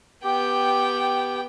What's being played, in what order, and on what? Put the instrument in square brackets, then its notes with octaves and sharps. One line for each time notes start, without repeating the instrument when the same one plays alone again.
[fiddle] B3 G5 [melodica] G4